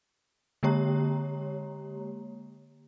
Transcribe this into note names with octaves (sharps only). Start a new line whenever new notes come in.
D3 G#3 A#3 G4 C#5 A#5